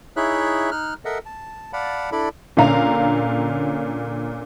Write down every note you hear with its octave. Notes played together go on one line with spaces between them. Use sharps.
D#4 E4 G#4 C#5 E5 F#6
D#4 F6 F#6
A4 A#4 D#5 E5 F#5
A5
D5 F5 F#5 A5 B5
D4 E4 A4 D5 B5
A#2 D3 C#4 F5 A#5